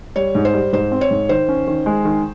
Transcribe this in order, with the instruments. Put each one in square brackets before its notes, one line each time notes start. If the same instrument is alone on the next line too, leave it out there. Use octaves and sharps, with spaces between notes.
[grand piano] G3 [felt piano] C#5
[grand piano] G#2
[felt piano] C5
[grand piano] G3
[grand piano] G#2 [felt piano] C5
[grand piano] C4
[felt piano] C#5
[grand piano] G#2
[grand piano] D#3 [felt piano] C5
[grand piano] C#4
D#3
G#3
D#3